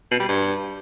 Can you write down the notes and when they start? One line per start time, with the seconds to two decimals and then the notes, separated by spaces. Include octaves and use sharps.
0.11 B2
0.20 G3
0.28 G2